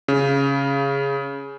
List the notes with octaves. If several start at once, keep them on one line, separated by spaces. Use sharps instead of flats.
C#3